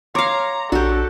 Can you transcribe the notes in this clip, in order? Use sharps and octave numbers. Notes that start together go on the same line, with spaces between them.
C#5 F5 A#5 C6 D6
A#1 D4 F#4 G4 A4